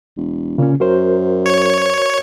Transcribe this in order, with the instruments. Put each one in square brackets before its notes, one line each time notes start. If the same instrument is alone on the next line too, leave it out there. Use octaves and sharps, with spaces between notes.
[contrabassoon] E1
[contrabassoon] A#2 [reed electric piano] C#3 C#4
[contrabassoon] F#2 [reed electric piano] F#4 A#4 C5
[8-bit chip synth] C#5